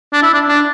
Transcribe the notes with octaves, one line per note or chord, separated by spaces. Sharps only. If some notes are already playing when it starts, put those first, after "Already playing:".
D4
E4
D4
D4